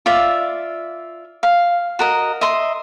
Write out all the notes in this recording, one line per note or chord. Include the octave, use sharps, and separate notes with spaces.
F4 D5 E5
F5
F#4 A#4 D#5
D#5 E5 C6